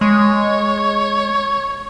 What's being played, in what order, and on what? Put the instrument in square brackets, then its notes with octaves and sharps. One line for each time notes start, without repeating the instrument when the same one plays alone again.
[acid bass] G#3 [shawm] C#5